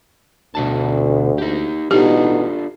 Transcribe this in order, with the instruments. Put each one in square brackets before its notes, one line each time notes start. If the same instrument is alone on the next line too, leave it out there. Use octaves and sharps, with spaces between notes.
[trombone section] D2 [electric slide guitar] B2 D3 A5
[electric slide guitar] D#4 G4
[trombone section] A1 B2 D#4 [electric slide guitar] D4 F4 A4 [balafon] G4